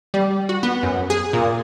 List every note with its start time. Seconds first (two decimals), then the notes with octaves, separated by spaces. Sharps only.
0.14 G3
0.49 F#4
0.63 B3
0.83 F#2
1.10 G#4
1.33 A#2